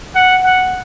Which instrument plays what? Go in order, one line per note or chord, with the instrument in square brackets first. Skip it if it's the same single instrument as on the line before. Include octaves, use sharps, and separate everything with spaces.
[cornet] F#5
F#5